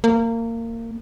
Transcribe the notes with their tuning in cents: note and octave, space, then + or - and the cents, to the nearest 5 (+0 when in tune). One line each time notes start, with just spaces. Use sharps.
A#3 -25